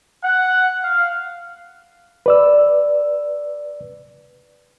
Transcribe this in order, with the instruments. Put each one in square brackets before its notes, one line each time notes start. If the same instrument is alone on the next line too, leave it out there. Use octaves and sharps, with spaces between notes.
[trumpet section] F#5
F5
[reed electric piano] B4 D5 E6